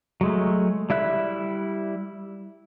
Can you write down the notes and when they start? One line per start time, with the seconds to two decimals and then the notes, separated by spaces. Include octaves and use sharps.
0.21 F#3 G#3 A3
0.90 G3 E4 E5 F#6